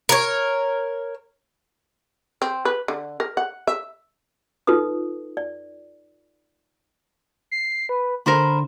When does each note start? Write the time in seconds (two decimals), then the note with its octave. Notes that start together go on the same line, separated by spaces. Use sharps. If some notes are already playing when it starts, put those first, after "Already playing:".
0.09 A#4 C#5
2.42 C4
2.65 B4
2.88 D3
3.20 A#4
3.37 F#5
3.67 E5
4.67 D#4 F4 A4 B4 D#6
5.37 D5
7.51 C7
7.89 B4
8.26 D3 A#4 C5 B5